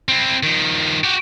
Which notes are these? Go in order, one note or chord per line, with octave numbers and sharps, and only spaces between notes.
C4 E4
D#3 F3
F#4 G4